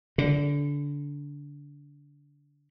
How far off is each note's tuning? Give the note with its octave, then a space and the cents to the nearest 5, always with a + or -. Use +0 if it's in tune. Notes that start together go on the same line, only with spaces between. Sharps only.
D3 -25